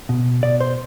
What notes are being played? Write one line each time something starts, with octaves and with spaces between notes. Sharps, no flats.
B2
B2 D5
C5